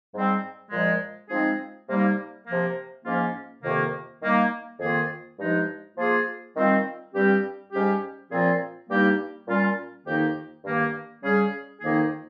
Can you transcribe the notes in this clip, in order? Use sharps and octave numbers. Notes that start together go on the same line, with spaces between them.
G#2 G3 C4
A#2 F3 G#3
F3 G#3 C4 D#4 G#4
C3 G3 A#3 D#4
C3 F3 A#3
G#2 F3 A#3 C#4 F4
F2 C3 D#3 A#3
D#3 G3 A#3 D#4
F2 D#3 A#3 F4 G#4
G2 F3 G#3 D#4
F3 A#3 F4 G#4
D#3 G3 C4 F4
G2 G3 C4 G4
G#2 G3 C#4 G4
A#2 F3 C4 F4 G#4
G2 G3 A#3 D#4 G4
A#2 G3 C#4 F4
F2 D#3 A#3 D#4 G4
G2 D#3 A#3
C#3 G3 C#4 G#4
F2 D#3 A#3 D#4 G#4